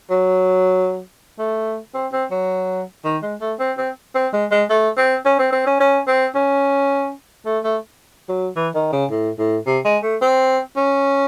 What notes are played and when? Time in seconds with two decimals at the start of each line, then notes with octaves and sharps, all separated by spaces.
0.10 F#3
1.39 A3
1.94 C4
2.13 C4
2.31 F#3
3.05 D#3
3.23 G#3
3.41 A3
3.59 C4
3.78 C4
4.15 C4
4.33 G#3
4.51 G#3
4.70 A3
4.98 C4
5.25 C#4
5.39 C4
5.52 C4
5.66 C#4
5.80 C#4
6.07 C4
6.35 C#4
7.46 A3
7.64 A3
8.29 F#3
8.56 E3
8.75 D#3
8.93 C#3
9.11 A2
9.39 A2
9.66 C3
9.85 G#3
10.03 A3
10.22 C4
10.77 C#4